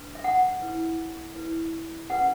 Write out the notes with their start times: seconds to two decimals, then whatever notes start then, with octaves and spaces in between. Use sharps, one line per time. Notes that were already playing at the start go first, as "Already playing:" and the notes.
Already playing: D4 F#4 B4
0.15 E5
0.24 F#5
0.62 E4 B4
1.35 E4 B4
2.10 C#4 G4 B4 F#5